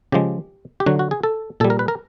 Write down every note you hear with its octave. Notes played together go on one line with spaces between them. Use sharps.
C#3 F3 G#3 G4
G4
D3 F#3 F#4
F#4
G#4
A4
A#2 G3 A4
A#4
B4
A#4